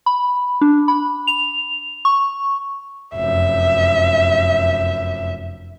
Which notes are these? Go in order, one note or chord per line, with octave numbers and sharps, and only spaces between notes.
B5
D4
B5
F7
C#6
F1 F#2 E5